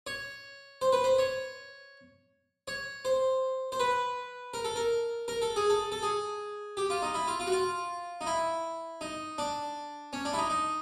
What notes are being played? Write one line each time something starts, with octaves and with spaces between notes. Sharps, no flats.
C#5
C5
B4
C5
C#5
C#5
C5
C5
B4
A#4
A4
A#4
A#4
A4
G#4
A4
A4
G#4
G4
F4
D#4
E4
F4
F4
F#4
F4
D#4
E4
D#4
D4
C#4
D4
E4
D#4
D#4